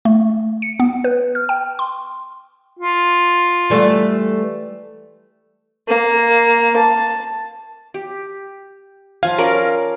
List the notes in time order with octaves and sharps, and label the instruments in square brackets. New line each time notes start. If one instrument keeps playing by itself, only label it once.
[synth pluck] A3
C#7
B3
B4
F6
G5
C6
[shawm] F4
[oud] E3 G3 A3
[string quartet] A#3
A5
[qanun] G4
[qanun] F3 G#5 [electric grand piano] F5
[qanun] C#4 A#4 D5